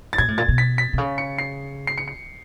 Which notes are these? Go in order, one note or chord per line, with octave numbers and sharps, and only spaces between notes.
A6
A#2 G#6
A2
A#2 A6
B2
B6
B6
C3
C#3
C#7
C7
C7
C#7
C#7